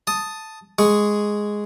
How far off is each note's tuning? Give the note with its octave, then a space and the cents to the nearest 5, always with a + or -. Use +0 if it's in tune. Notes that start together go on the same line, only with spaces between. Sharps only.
A5 +0 D#6 +0
G#3 +0 G#4 +0 C#6 +0